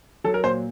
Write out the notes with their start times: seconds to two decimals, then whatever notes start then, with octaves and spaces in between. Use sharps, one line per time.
0.24 F#3 A4
0.34 A#4
0.44 A#2 C5